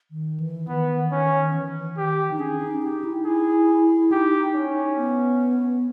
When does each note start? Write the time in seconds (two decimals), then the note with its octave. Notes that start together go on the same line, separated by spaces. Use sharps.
0.11 D#3
0.40 E3
0.68 D#3 B3
1.12 C#4
1.54 E3
1.97 D#3 G4
2.31 D#4
2.39 C#4 G#4
2.61 D#4
2.82 D#4 G4
3.04 E4
3.25 E4 G#4
4.12 D#4 G4
4.55 C#4
4.97 B3